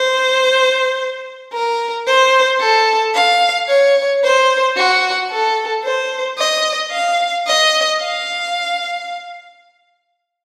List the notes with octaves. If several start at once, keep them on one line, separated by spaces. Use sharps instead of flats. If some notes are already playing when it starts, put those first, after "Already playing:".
Already playing: C5
A#4
C5
A4
F5
C#5
C5
F#4
A4
C5
D#5
F5
D#5
F5